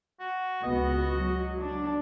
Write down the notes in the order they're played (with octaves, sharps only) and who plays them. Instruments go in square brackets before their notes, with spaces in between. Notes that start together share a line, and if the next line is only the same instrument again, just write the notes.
[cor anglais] F#4
[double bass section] C#2 B3 [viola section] F#4 [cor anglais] D#5
[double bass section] F#3
[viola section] D4